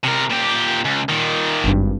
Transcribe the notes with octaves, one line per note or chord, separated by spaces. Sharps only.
C3 A#4
A#2 G4
C#2
A#2 D#3
G#1 G2